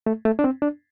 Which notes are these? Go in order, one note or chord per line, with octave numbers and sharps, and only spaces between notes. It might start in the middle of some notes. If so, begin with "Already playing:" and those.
A3
A3
D4
C4
D4